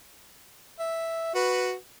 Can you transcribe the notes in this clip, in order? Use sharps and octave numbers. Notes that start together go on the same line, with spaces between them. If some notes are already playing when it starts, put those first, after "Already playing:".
E5
F#4 B4